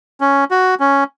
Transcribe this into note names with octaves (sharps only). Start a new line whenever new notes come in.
C#4
F#4
C#4